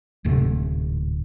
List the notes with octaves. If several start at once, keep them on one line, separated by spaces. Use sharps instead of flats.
D1 G#2 C3 A3